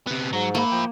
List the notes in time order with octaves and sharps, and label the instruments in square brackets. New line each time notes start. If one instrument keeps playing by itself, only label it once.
[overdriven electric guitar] C3 B3
[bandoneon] G#2 [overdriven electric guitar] F#3
[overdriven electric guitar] A3 B5 [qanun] A#3
[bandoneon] F3 G5